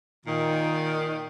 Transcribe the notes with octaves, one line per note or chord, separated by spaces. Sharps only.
A#2 D#3